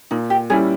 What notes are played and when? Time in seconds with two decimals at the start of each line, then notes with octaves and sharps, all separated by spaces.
0.11 A#2 D#4
0.30 G4
0.50 G3 C#4 E4 G#4